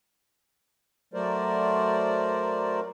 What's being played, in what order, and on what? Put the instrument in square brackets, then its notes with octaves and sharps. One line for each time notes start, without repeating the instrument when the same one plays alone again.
[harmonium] F#3 A3 A#4 C5 D5